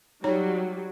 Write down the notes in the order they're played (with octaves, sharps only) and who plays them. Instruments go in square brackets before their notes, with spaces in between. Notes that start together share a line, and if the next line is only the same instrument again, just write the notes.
[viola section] F#3 [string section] G3 [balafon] D#4 C#5 A#5